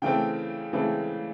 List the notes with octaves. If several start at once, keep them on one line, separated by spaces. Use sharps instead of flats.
C#3 E3 A3 C4 G5
C#3 E3 A3 C4